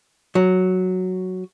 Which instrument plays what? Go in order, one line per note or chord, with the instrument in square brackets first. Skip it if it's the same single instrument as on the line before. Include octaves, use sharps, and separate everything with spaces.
[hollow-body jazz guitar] F#3